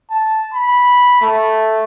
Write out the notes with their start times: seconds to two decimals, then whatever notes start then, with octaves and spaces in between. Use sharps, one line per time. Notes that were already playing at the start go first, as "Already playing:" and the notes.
0.10 A5
0.54 B5
1.22 A3